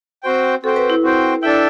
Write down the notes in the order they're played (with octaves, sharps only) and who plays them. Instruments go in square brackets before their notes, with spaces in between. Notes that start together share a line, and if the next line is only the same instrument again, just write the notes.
[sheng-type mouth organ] C4 F#4 C5 G5
[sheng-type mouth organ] C4 F#4 C5 G5 [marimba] A4
[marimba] B4
E4
[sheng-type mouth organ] C4 F#4 C5 G5
[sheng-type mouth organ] D4 A4 E5 G5 [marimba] E4